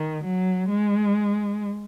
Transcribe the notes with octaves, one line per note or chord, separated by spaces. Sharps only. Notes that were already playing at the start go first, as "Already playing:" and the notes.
Already playing: D#3
F#3
G#3